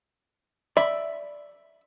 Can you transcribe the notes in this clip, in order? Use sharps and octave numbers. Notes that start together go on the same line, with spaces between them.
D5 E5 B5